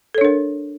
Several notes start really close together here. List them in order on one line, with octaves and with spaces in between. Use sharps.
A4 C#5 D4 A#4